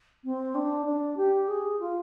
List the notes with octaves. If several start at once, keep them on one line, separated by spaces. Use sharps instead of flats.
C4
D4
D4
G4
G#4
F4